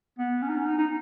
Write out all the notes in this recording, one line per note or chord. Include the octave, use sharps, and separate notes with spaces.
B3
C#4
D#4
C#4
D#4
D#4